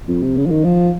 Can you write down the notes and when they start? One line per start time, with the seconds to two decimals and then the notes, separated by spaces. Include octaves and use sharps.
0.08 F2
0.23 C3
0.37 C#3
0.46 F3
0.51 D#3
0.64 F3